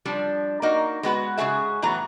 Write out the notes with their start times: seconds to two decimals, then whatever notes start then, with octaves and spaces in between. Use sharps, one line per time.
0.05 F3 G3 D4
0.62 A#3 D#4 F#4
1.03 G#3 B3 F#4 B4
1.38 G#2 C#3 F#4 G#4 E5
1.82 A2 E3 F#3 B3 A#5